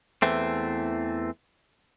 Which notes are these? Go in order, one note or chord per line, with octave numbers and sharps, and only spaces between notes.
E2 E3 A3 C4